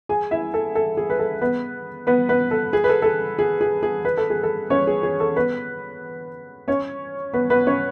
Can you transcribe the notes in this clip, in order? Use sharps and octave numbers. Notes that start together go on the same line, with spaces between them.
G#4 G#5
E4 E5
A4
A4
G#4
B4
A4
B3 B4
B3 B4
B3 B4
A4
G#4
B4
A4
A4
G#4
G#4
G#4
G#4
B4
A4
G#4
A4
C#4 C#5
G#4
G#4
A4
B3 B4
C#4 C#5
B3 B4
B3 B4
C#4 C#5